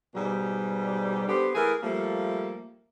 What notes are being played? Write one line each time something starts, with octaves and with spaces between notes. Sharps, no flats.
G#2 B2 G3
B3 D4 G4 A4 C5
E3 A3 G#4 A#4
F3 G3 A3 A#3